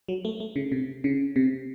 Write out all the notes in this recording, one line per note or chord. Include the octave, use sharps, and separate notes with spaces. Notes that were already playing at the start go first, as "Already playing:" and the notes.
F#3
A3
A3
C#3
C3
C#3
C3